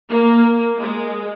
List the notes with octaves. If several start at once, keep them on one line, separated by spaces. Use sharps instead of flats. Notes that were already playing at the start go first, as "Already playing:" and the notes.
A#3
G#3